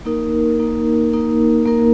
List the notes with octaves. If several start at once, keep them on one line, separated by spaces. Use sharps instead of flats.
A#3 D#4 A#4
A#3 D#4 A#4
A#3 D#4 A#4
A#3 D#4 A#4